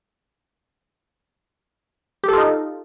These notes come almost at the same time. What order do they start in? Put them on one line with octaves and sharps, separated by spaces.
G4 A4 F4 D#4